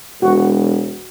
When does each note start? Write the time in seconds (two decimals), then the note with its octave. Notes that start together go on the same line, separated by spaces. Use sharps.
0.22 E1 F#4